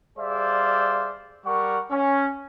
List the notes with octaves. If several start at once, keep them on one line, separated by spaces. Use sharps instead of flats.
G3 G#4 C5 D5 E5 F5
G3 A#4 F#5 C#6
C#4